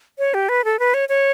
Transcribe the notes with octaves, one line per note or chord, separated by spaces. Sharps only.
C#5
G4
B4
A4
B4
C#5
C#5